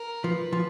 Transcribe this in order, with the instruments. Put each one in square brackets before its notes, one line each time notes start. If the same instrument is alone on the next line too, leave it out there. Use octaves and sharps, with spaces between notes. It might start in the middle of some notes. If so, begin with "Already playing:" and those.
Already playing: [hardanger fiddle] A#4
[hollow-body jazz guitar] F3 [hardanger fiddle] B4
[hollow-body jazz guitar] F3